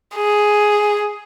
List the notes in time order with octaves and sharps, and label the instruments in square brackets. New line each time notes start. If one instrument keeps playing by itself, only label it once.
[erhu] G#4